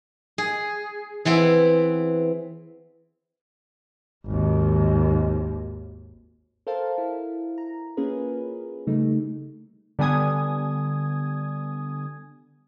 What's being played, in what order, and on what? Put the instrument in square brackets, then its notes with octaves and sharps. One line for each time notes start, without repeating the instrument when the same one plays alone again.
[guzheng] G#4
E3 B3 C4 E4
[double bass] G#1 D#2
[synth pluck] A4 A#4 C5 F5 A5
E4
A#5
A#3 C#4 F4 G#4 A#4 B4
C#3 G3 A3 D#4
[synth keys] D3 G3 B3 G#5 D#6 G#6